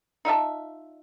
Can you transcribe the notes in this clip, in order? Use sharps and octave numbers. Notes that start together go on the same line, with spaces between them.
D#4 F4 E5 A5